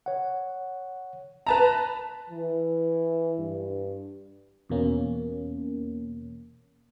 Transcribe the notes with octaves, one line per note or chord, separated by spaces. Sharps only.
C#5 F#5
B4 A5 A#5
E3
G2
E2 B2 A#3 C#4